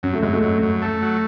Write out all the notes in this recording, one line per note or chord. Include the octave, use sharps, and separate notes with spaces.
F#2 C#4
A3
F#2 G#3
A3
F#2
F#2
A3
F#3